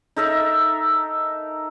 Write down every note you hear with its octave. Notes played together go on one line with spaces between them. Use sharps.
D#4 A4 A#4 E5